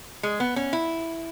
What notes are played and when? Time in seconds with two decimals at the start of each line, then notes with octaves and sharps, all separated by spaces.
0.23 G#3
0.40 B3
0.56 C#4
0.73 E4